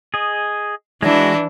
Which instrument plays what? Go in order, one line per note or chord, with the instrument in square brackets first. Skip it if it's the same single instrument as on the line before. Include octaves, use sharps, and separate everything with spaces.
[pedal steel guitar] G#4 D#5
[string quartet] E3 D4 E4 [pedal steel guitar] G#3 F#4